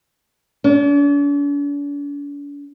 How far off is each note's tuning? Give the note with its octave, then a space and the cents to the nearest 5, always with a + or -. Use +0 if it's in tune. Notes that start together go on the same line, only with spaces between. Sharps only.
D4 -45